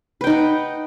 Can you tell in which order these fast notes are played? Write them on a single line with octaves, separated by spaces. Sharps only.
B4 G5 D#4 F#5